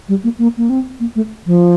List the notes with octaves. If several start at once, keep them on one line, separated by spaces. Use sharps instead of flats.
G3
A#3
A#3
A#3
C4
A#3
A3
F3